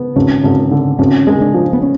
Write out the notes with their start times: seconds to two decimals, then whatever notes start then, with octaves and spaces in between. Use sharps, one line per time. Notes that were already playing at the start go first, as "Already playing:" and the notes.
Already playing: B3
0.16 G#1 C#4
0.44 G#1
0.71 D3
0.99 G#1 C#4
1.27 G#3
1.41 D4
1.54 F3
1.73 B3
1.82 C#4